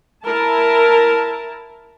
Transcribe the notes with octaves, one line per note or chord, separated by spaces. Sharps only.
E4 A#4 A5